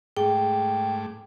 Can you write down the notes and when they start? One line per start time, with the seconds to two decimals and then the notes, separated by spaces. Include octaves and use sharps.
0.17 G#2 A3 G#4 G5 D6